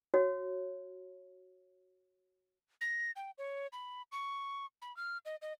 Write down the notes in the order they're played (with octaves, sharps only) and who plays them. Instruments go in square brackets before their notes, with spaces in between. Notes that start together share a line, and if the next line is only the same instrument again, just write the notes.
[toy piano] F#4 C#5
[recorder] A#6
G5
C#5
B5
C#6
B5
F6
D#5
D#5